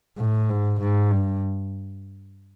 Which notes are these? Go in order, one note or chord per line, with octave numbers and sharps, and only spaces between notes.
A2
G#2
G#2
G2